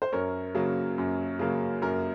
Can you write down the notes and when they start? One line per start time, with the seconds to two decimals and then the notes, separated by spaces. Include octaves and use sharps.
0.02 C5
0.12 F#2 A#4 C#5
0.55 C#3 F#3 A#3
0.98 F#2
1.39 C#3 F#3 A#3
1.82 F#2 A#4